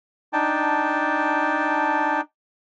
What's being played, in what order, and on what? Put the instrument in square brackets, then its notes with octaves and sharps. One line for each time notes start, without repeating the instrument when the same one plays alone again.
[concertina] D4 D#4 G5 A5